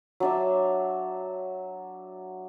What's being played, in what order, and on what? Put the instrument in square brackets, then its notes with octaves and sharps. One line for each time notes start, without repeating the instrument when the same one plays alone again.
[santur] F#3 D4 E5